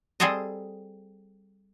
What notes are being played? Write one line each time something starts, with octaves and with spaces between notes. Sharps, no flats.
G3 C4 G#4 A4 C5 D#5